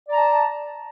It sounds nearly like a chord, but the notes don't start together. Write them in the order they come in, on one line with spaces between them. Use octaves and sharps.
D5 A#5 A5